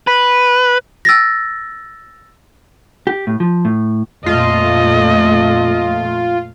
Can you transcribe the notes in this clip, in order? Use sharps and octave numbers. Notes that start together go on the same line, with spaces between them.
B4
E6 A6 A#6
G4
A2
F3
A2
F2 A#2 A3 F4 D#5